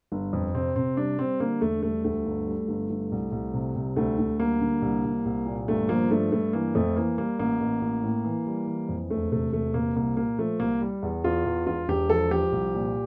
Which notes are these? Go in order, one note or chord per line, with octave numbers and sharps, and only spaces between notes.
G1
F2
C3 C4
C3 C4
G3 D4
G3 C4
D3 A#3
E1 A3
G3 A3
D2 A3
G1
G3
G1
G1
C2
C2
C3
C2
D2 A3
D2
G3 A#3
D3
C2
C2
C2
A#2
G1 A3
F3 A#3
G2 A3
G2 A3
E3 A#3
F2 A3
E3 A#3
G3 A#3
A1 A#3
A1
A1
A2
E3
G3
E3
F2
E1 A3
C3 A3
E1 A3
C3 A#3
C2 A#3
A#2 A#3
F3 A3
C2 A#3
G3
E2
E2 F4
E2
E1 F4
E1 G4
F3 A4
F3 G4
C2
A#2